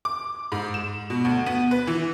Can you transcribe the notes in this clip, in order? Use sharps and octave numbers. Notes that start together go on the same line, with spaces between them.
D6
G#2
E7
B2
D2
B3
B4
E3